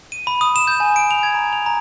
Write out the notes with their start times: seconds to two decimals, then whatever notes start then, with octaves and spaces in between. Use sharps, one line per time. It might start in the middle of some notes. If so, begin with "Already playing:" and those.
0.12 D#7
0.27 B5
0.41 D#6
0.56 E7
0.68 G6
0.80 G#5
0.96 D7
1.11 F7
1.23 G#6
1.35 A#5
1.53 F7
1.66 A#5